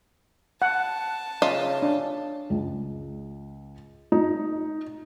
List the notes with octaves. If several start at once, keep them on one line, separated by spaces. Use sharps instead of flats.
F#5 A5
C#3 F4 D#5 E5
D4
C#2
D#4